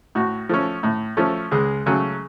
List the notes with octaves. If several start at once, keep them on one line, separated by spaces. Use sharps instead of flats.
A2 F#4
F3 A3 C#4
A2
F3 A3 C#4
C#2 G#3 G#4
C#3 F#3 A3 C#4